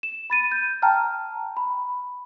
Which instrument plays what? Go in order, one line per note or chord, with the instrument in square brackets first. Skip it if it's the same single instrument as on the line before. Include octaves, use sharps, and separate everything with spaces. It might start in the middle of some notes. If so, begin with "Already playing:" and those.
[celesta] E7
B5 A6 D#7
G6
G5 A5 A#5 F6
B5